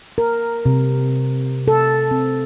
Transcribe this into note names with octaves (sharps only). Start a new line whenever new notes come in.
A#4
C3
A4
C4